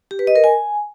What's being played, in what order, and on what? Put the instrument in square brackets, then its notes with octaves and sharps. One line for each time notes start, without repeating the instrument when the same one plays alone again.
[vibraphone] G4
B4
D#5
A#4
G#5